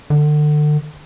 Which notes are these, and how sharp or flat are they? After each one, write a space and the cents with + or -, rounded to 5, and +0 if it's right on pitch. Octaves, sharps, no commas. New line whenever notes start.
D3 +35